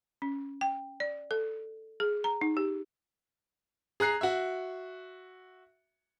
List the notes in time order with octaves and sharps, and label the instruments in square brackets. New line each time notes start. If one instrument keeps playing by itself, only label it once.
[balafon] C#4
G5
D5
A4
G#4
A#5
D#4
G4
[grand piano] G#4 A#5 F#6 C7
F#4 E5